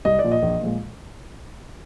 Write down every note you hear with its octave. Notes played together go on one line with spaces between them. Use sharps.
C2 D#5
D5
A#2 F3
D#5
A#1
A#2 F3 G#3